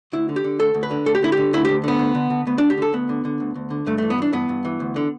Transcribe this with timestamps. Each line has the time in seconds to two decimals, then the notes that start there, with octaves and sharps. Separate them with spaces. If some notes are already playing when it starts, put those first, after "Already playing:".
0.13 D2 E4
0.29 D3
0.36 G4
0.44 D3
0.59 D2 A4
0.74 D2
0.83 B4
0.91 D3
1.06 D2 A4
1.15 G4
1.22 D3 E4
1.32 G4
1.37 D3
1.53 D2 E4
1.65 D2 G4
1.84 D3 B3
1.99 D2
2.15 D3
2.30 D3
2.47 D2 B3
2.58 D2 D4
2.70 G4
2.77 D3 A4
2.93 D2 B3
3.09 D3
3.25 D3
3.40 D2
3.55 D2
3.70 D3
3.86 G2 A3
3.98 E3 A3
4.10 B3
4.18 E3 D4
4.33 G2 B3
4.49 G2
4.65 E3
4.80 D2
4.96 D3